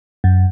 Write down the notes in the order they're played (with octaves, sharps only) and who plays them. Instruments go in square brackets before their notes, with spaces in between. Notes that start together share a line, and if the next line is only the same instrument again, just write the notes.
[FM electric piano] F#2